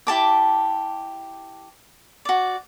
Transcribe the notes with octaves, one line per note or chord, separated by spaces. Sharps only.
E4 G4 A5 D6
F#4 D5